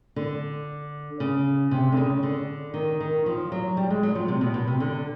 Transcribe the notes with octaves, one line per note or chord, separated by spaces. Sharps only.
D3
C#3
C3
D3
C#3
D3
D#3
D#3
F3
F#3
G3
G#3
F#3
F3
C3
B2
B2
C3
D3